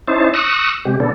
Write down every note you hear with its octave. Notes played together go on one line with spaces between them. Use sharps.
C#4 D#4 E4 C5 A5
C#6 D#6 E6 F#6 A#6
C3 G#3 G4
B2 D3 B3 D4 A4